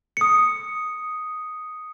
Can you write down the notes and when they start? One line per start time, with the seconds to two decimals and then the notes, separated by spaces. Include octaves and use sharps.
0.17 D#6 C#7